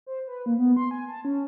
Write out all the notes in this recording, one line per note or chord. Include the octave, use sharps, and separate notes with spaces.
C5
B4
A#3
B3
C6
G#5
A5
C#4